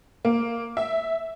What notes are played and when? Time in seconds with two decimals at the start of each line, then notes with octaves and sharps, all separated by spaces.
0.25 A#3
0.77 E5